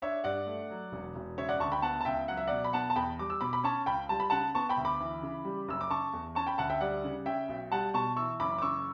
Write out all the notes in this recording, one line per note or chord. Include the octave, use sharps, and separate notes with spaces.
D4 C#5 E5
G2 D5 F#5
A3
F#3
E1
E1
C#3 C#5 E5
D5 F#5
D2 A5 C#6
G5 B5
B3 F#5 A5
A5
C#2 E5 G5
F#3 F#5
E5
B2 D5 F#5
B5
B3 F#5 A5
A5
E2 G5 B5
G3 D6
E6
B2 B5 D6
B5
C#4 A5 C#6
C#2 G5 B5
G3 A5
B5
C#3 F#5 A5
B3 A5 C#6
G5 B5
D2
B5 D6
E3
C#3
G3
F#1 E6
D6
C#3 A5 C#6
E2
C#4 A5 C#6
G5 B5
D2 F#5 A5
E5 G5
G3 D5 F#5
C#3
C#4 E5 G5
B1
G3 F#5 A5
B2 A5 C#6
E3 C#6 E6
F#1 B5 D6
D6
C#3 C#6 E6